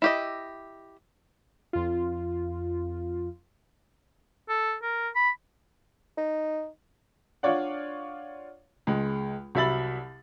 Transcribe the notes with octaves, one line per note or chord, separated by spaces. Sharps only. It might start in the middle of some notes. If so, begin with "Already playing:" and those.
E4 G4 D#5
F2 F4
A4
A#4
B5
D#4
D4 F4 C#5 D5 F#5
C#2 G#3
C2 F#3 E5 B5 A6 F#7